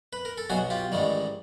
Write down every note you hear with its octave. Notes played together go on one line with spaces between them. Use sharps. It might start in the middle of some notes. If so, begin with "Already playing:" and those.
B4
A#4
A4
B1 B2 F#3 F#4 G#4
F4 G4
A1 G#2 D#3 G3